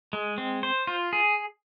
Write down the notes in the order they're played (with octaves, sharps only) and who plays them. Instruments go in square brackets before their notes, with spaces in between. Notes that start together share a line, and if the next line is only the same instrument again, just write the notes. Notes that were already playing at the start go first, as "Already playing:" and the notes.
[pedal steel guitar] G#3
C4
C5
F4
G#4